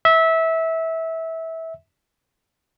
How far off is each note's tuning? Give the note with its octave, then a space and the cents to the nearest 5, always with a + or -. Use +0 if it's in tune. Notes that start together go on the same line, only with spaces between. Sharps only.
E5 -20